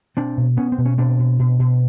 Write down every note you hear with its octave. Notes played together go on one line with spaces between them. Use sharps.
B2 C4 D4
B2
B2 B3 C#4
C4
B2
C#4
B2 C4 D4
B2
B2
B2